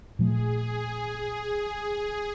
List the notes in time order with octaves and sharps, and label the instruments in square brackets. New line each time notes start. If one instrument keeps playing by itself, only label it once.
[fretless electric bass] A#2 F3 A3 [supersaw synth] G#4